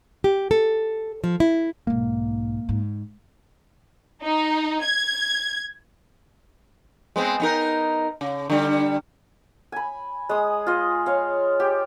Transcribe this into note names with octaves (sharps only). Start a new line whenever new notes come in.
G4
A4
F3
E4
B1 G#2 A#3
G#2
D#4
G#6
G#3 B3 C4
B3 D#4 A#4
C#3
D3 G3
G#5 B5
G#3 D#6
F4 D#5
C#5 F5
G4